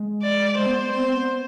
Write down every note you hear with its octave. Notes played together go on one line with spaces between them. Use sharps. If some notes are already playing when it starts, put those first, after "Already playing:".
Already playing: G#3
D5
G#3 C5
B3
B3
C4 C5
B3